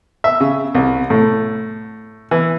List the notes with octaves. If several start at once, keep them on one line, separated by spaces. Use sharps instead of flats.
E5
C#3
C2
A2
E3